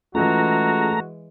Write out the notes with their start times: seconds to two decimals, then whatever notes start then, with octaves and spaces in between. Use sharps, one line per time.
0.15 E3 G#3 A3 C#4 F4 F#4 G#4 A#5